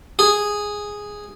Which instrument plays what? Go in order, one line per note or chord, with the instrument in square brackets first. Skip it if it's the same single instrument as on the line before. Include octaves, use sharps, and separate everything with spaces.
[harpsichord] G#4